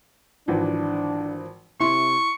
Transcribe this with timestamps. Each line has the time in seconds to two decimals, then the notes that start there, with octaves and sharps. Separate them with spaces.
0.48 G#1 E3 F3 D4
1.80 C3 E4 C6 C#6